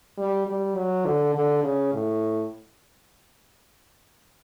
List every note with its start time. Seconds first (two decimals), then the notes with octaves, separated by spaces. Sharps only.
0.18 G3
0.47 G3
0.76 F#3
1.05 D3
1.34 D3
1.63 C#3
1.93 A2